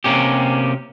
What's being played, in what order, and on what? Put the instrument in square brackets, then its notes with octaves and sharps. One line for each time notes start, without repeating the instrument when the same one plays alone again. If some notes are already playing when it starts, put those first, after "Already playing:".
[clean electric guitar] C3 A#3 C#4 G4